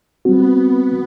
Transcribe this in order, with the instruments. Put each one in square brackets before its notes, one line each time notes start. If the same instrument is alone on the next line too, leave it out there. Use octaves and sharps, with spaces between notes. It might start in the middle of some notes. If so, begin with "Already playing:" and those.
[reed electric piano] G3 C4 F#4 [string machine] B3